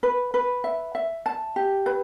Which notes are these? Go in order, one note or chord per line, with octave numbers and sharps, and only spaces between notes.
B4
B4
E5
E5
A5
G4
B4